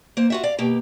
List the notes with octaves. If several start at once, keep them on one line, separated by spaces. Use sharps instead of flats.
A#3 C5
F4 F#4 E5
D5 F5
B2 A#3 G4